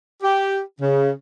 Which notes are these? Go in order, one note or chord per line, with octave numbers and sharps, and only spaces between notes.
G4
C#3